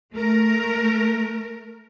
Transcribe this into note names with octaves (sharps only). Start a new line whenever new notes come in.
A3 A#4